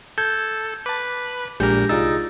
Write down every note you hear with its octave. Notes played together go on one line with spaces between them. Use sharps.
A4 G6 G#6
B4 A5 D6
A#1 A#2 G#3 D4 G4 A#4 G6
C2 D#4 F4 G#4 D5 E6 A6